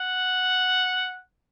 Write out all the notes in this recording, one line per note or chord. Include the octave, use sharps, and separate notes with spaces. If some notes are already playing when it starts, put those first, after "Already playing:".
Already playing: F#5